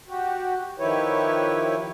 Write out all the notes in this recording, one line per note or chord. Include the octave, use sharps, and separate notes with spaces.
F#4 G4
D#3 F3 E4 G4 B4 C#5